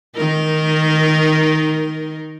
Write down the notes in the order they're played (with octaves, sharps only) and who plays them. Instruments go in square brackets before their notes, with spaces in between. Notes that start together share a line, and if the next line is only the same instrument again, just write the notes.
[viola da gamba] D#3 D#4 A#4